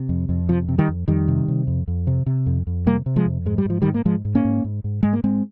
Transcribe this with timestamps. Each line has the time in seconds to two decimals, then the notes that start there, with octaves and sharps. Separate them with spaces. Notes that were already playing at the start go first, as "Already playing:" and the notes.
Already playing: C3
0.09 F2
0.29 F2
0.49 C3 F3
0.69 C3
0.78 D#3 G3
0.89 F2
1.08 F2 D#3 G3
1.28 C3
1.48 C3
1.67 F2
1.88 F2
2.07 C3
2.26 C3
2.46 F2
2.67 F2
2.86 C3 G3 A#3
3.06 C3
3.16 F3 G#3
3.26 F2
3.46 G#2 G#3
3.58 G3
3.65 G#2 F3
3.82 D#3 G3
3.85 G#2
3.94 A#3
4.05 G#2 F3 G#3
4.25 G#2
4.35 A#3 C#4
4.45 G#2
4.64 G#2
4.84 G#2
5.03 G#2 G#3
5.13 A#3
5.24 G#2 G#3 C4